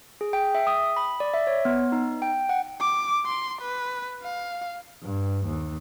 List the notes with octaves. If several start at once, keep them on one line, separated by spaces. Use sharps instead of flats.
G#4
G5
E5
D#6
B5
D5
E5
C#5
B3
D#4
G5
F#5
D6
C6
B4
F5
G2
D#2